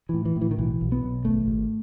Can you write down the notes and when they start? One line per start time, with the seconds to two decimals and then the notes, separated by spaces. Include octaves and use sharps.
0.09 A2 E3
0.25 E3
0.36 A2
0.41 E3
0.51 D#3
0.58 B1 E3
0.81 B1
0.92 B3
1.03 B1
1.25 G#1 A3
1.46 G#1